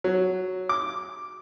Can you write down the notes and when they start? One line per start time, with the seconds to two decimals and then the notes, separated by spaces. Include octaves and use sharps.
0.04 F#3
0.69 D6